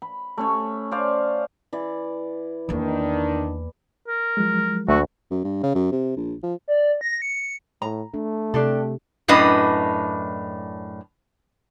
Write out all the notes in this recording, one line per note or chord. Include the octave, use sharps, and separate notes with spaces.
B5
A3 C#4 C#5
C#4 C5 D5 F5
E3 D5
E2 D#3 A#3 D4
A#4
F3 F#3 G#3
D2 A3 F#4
F#2
G2
C#3
F#2
C3
A#1
F3
D5
A#6
C#7
A2 A#5
A3 D4
C3 D4 G4 A4
F#2 A2 D4 B4 D#5